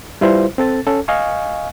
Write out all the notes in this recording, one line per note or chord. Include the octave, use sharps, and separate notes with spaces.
G3 E4 F4 B4 C5
C4 A4 A6
C#4 A4
D#5 F5 G#5 C#6